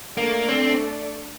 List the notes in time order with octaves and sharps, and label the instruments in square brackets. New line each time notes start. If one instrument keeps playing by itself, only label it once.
[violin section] A3 D4 A4 D5 [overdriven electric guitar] A#3
[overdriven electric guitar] C4